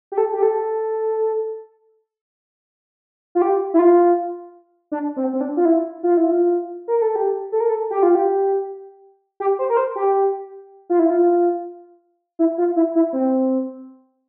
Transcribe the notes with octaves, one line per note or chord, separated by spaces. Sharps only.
G4
A4
G4
A4
F4
G4
E4
F4
D4
C4
C4
D4
F4
E4
F4
E4
F4
A#4
A4
G4
A4
A#4
A4
G4
F4
G4
G4
C5
A#4
C5
G4
F4
E4
F4
E4
F4
E4
E4
C4